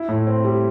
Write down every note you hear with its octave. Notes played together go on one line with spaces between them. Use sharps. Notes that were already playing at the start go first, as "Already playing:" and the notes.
Already playing: E4
A2
C4
G3